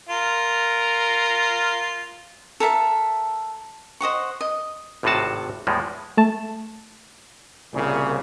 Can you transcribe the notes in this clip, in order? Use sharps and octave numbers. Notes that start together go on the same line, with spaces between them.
F4 A#4
A4 A#4 E5 A5
C5 D#5 F#5 C#6
D#5
G#1 A2 C3 F4 F#4 A5
E2 A2 F3 G3 G#3
A3 A5
C2 A#2 C#3